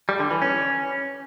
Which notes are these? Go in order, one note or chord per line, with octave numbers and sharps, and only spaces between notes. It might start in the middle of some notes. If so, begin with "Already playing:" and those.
G3
D3
E3
C#4